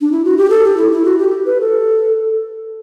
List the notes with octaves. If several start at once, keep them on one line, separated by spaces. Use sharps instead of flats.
D4
E4
F#4
G4
A4
G4
E4
E4
F#4
G4
B4
A4